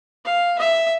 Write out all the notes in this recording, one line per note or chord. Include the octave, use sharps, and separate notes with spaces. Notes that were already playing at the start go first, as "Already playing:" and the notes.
F5
E5